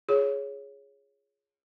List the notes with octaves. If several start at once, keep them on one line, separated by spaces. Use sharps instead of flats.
F4 G#4 C#5